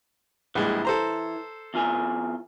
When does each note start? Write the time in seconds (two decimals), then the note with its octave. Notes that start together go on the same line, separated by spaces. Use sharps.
0.55 A#1 E3 G3 G#3
0.85 A4 C5 A#5
1.74 E2 F4 G#5